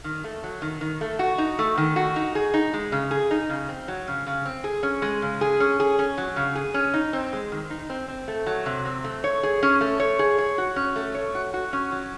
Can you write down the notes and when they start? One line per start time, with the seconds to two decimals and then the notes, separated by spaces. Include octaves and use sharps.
0.04 D#3
0.24 A3
0.44 F#3
0.62 D#3
0.81 D#3
1.01 A3
1.19 F#4
1.38 D#4
1.59 A3
1.78 D#3
1.96 F#4
2.16 D#4
2.35 G#4
2.54 D#4
2.74 G#3
2.92 C#3
3.11 G#4
3.31 D#4
3.50 C#3
3.69 C4
3.88 F#3
4.08 C#3
4.27 C#3
4.45 C4
4.64 G#4
4.83 C#4
5.02 G#3
5.22 C#3
5.41 G#4
5.60 C#4
5.80 G#4
5.99 C#4
6.18 F#3
6.36 C#3
6.55 G#4
6.74 C#4
6.94 D#4
7.13 C4
7.33 G#3
7.52 D#3
7.70 D#4
7.90 C4
8.08 C4
8.28 A3
8.47 F#3
8.66 C3
8.85 C4
9.04 A3
9.24 C#5
9.43 G#4
9.63 C#4
9.81 A3
10.00 C#5
10.19 G#4
10.38 C#5
10.58 F#4
10.76 C#4
10.96 A3
11.15 C#5
11.35 F#4
11.54 F#4
11.73 C#4
11.92 F#3